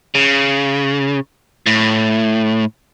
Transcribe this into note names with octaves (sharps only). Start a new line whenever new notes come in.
C#3
A2